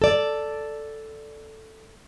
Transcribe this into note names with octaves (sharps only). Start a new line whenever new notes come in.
A4 D5